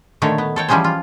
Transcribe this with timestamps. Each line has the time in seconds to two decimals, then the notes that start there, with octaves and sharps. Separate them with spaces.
0.22 A#2 D3 D#3 A3 C#5
0.38 B3
0.56 A4 C#5 G5
0.69 E3 F3 G3 C#4 G#4 C5
0.84 F4